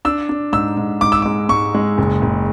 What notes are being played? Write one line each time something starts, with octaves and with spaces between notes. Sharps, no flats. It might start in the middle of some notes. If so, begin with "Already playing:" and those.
D4 E6
D4
G#2 E6
G#2
G#2 D6
E6
G#3 D6
G#2 C#6
G#3
F#1
F#1